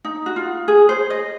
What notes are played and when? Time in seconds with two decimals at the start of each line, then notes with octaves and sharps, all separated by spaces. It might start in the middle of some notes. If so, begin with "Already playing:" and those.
0.05 D#4
0.26 F#4
0.36 F4
0.68 G#4
0.89 C5
1.10 D#5